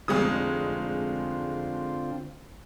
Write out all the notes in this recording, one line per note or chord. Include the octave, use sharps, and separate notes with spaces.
F1 D3 G#3 C4 F4 D#6